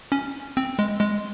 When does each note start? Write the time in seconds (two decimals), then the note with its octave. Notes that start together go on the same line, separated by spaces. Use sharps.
0.12 C#4
0.57 C4
0.79 G#3
1.01 G#3